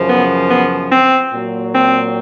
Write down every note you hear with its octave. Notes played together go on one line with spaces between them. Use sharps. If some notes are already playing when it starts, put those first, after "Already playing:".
Already playing: F#2 C#3 F3
B3
B3
C4
A#2 F#3
C4